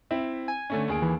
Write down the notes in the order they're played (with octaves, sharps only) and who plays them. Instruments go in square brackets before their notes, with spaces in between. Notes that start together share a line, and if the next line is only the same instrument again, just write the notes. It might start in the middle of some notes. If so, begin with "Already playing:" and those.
[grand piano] C4 E4 E5
[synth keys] G#5
[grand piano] D3 A3 C#4
D#2 G#4 D7
[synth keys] E3